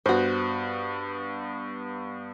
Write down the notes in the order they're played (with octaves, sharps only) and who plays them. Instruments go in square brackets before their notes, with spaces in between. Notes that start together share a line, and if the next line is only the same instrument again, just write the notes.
[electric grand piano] G2 B3 [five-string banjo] F#4 C5